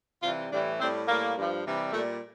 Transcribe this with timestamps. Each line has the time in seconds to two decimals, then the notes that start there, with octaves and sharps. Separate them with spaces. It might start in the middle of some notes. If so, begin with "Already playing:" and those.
0.23 C3 E3 G3 F4
0.51 A2 E3 G3 D4
0.79 A2 G3 C4
1.08 A2 G3 A#3
1.35 G2 F3
1.64 C3 E3 G3
1.92 A#2 G3 A3